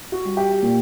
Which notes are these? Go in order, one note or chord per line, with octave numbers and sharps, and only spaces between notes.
F#4
G3
G4
A#2